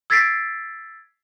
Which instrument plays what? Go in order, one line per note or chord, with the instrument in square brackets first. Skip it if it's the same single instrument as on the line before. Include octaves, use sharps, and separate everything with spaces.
[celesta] E6 G#6 A6 B6 C7 D7